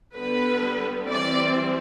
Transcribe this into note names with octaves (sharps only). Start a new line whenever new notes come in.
D3 G3 B3 B4
E3 G3 C4 D5